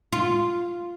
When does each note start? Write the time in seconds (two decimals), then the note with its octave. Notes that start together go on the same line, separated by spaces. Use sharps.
0.12 F4